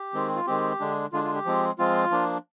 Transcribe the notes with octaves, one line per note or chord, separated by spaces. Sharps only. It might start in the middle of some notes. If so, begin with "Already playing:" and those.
Already playing: G4
D#3 G#3 C4
F4
D#3 G#3 C4 G4
D3 G#3 D4
D3 G#3 D4 F4
F4
G4
F3 G#3 C4
F3 G#3 C4 F4
F3 A#3 D4